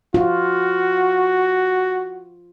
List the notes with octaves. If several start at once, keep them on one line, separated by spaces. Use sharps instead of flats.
F4 F#4